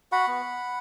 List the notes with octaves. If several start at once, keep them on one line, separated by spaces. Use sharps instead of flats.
F#4 F#5 B5
B3